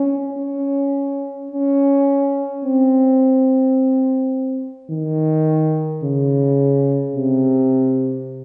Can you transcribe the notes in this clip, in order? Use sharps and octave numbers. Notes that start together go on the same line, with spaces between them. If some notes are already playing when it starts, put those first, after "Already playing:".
Already playing: C#4
C#4
C#4
C4
D#3
C#3
C3